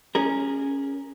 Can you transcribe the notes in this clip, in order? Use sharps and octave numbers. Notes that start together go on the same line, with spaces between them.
C#4 G#4 A#4